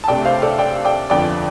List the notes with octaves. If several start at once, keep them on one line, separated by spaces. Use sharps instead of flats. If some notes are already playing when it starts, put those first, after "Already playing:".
A5
C2 C3 A3 D4 D5 G5
C5 F5
A4 D5
D5 G5
D5 G5
G1 F2 D3 F3 D5 G5